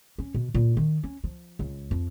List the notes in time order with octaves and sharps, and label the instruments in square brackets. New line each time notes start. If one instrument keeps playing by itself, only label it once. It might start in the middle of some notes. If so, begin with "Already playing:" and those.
[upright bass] C#4
B2
A#2
D#3
C#4
F3
C#2
F2